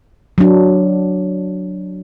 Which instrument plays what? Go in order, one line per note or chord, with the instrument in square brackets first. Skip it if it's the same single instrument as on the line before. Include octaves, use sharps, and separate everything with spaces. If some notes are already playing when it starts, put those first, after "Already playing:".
[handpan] F#3 D4